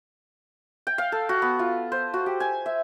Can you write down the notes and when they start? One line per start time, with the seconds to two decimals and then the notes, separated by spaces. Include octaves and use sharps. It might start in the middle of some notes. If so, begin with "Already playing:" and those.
0.87 G5
0.98 F5
1.12 A4
1.29 F#4
1.42 B3
1.59 F4
1.92 C5
2.14 F#4
2.26 G4
2.40 G#5
2.66 E5